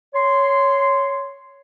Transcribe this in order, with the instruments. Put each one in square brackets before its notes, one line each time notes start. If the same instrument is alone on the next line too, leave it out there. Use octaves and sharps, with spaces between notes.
[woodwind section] C#5 C6